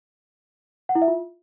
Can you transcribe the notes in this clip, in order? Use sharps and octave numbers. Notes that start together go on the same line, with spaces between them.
F#5
E4
E5
F4